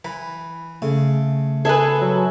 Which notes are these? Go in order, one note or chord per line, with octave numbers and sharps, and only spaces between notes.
E3 B5
C#3 A3
G#4 A4 B4 E5
F#3